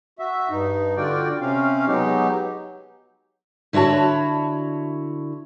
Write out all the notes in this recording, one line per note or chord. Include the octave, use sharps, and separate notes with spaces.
F#4 E5
G2 D#4
D3 F4 F#4 D5 G5
C3 C4 C#4 F5
B2 F#3 G#3 D#4 G4
D3 E4 F#4 C#5 A5